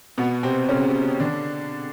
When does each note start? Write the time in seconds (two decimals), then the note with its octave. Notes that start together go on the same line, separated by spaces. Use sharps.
0.18 B2 B3
0.43 C3 C4
0.69 C#3 C#4
1.20 D3 D4